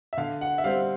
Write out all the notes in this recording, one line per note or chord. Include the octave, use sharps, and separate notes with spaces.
E5
D3 F5
F#5
E5
G3 C4 F5